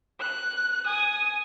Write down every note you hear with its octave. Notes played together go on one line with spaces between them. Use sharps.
F#6
G#5 D#6